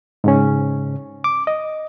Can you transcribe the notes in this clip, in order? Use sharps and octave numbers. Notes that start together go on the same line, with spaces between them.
G#2 C#3 C#4
D6
D#5